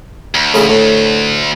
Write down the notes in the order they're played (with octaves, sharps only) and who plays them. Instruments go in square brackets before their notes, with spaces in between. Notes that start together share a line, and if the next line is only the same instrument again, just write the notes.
[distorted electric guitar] D2
[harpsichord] A1 C#3 B5
A2